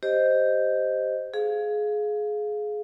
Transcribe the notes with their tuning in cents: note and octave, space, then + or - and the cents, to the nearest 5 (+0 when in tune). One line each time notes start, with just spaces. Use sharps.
G4 +0 C5 +0 D#5 +0
G#4 +20 F5 +0